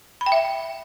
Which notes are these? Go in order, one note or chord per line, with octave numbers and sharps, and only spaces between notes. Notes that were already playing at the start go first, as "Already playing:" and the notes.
B5
G5
E5